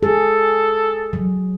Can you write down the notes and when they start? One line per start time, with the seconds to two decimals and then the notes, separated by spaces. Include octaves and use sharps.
0.03 G#4 A4
1.13 F#3